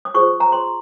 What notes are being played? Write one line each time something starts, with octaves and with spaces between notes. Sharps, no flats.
D#6
F4 G#4 C5 C#6
A#5
C6